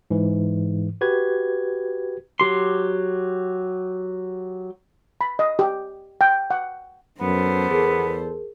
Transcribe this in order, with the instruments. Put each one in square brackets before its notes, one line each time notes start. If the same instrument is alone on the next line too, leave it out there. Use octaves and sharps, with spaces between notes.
[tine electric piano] G#2 E3
F#4 G4 B4 G#6
[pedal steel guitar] F#3 G4 C6
[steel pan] B5
D#5
G4
G5
F#5
[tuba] F#2 [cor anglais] B3 [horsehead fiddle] A4 C5
[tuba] E2 [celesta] G#4 A#4